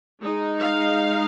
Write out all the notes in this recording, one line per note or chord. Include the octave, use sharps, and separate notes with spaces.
G#3 D#4
F5